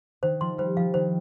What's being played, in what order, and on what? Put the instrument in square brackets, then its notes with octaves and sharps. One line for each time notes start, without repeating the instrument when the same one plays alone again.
[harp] D#3 [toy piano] C5
[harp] F3 [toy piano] C6
[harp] G3 [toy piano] C5
[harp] F3 [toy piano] F5
[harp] D#3 [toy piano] C5